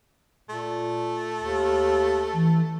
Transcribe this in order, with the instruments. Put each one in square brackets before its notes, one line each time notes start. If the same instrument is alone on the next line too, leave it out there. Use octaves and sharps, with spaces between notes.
[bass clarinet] A#2 [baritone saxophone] A3
[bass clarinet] D#2
[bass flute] E3